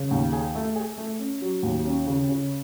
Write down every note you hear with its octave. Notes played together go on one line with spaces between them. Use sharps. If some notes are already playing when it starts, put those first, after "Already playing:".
Already playing: C#3
D#2
G#4
A3
G#4
A3
C#4
F#3
D#2
C#4
C#3
C#3